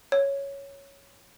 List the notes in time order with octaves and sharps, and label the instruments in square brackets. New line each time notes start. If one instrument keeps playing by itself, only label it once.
[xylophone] C#5